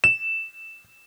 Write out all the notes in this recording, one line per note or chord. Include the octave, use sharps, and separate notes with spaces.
E7